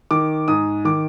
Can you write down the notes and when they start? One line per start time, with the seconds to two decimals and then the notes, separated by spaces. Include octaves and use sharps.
0.11 D#3 D6
0.48 G#2 D#6
0.85 D#3 D6